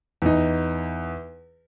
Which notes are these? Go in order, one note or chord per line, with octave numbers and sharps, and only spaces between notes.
E2 D#4